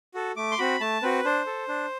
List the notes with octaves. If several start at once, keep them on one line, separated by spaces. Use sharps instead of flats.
F#4 A4
A3 D6
C6
C4 F#4 B5
A3 A5
C4 F#4 B4
D4 C5
A4
D4